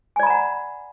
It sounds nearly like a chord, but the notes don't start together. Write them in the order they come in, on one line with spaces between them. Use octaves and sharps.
G#5 D5 B5 A#5 F#5